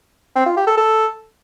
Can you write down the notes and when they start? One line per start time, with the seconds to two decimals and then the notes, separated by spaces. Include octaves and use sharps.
0.36 C4
0.46 F4
0.57 G4
0.67 A4
0.77 A4